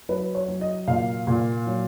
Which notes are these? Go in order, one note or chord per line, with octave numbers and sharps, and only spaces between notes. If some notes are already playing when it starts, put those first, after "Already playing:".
F#3 B4
C#5
F#3
D#5
A#2 F5
A#2
F#3